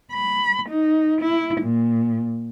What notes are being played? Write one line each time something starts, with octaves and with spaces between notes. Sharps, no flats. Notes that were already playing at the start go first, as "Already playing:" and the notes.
B5
D#4
E4
A#2